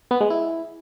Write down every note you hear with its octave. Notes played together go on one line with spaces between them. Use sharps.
B3
G#3
E4